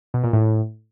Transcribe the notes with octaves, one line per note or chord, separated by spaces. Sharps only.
B2
A#2
A2